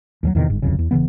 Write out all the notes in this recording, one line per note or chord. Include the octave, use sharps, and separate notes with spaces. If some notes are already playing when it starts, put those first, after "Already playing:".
D#2 C#3 F#3
E2 A2 C3 D#3
G1 G#2
D1 C2 F2 C#3
E2
E1 C#3 E3 B3